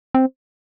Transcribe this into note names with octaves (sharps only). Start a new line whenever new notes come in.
C4